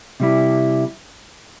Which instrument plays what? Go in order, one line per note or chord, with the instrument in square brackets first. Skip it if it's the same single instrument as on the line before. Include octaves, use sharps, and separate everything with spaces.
[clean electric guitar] C3 G3 E4